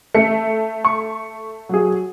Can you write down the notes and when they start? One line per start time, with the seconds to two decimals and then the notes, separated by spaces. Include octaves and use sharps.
0.15 A3 C#7
0.85 C#6
1.69 F#3 G#4